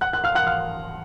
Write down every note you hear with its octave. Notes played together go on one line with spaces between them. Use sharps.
F#5 F#6
F#5 F#6
F5 F6
F#5 F#6
F5 F6